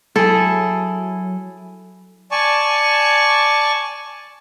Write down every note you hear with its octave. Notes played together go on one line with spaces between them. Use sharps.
F#3 E4 G#4 A4
D5 G#5 A5 C#6